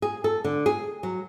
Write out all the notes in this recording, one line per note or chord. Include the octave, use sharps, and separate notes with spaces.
G#4
A4
D3
G#4
F#3